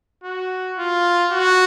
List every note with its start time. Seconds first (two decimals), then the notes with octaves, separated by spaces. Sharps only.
0.24 F#4
0.78 F4
1.31 F#4